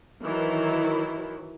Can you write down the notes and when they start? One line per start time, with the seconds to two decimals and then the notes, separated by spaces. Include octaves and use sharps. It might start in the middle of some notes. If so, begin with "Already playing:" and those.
0.22 D#3 E3 F#3 E4